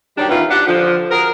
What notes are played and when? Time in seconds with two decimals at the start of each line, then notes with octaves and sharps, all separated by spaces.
0.17 D#3 F#3 G3 D4 G4
0.29 D#3 E3 B3 C#4 F4
0.50 D4 G4 D5 F#5
0.67 D3 F3
1.11 F#4 G#4 A#4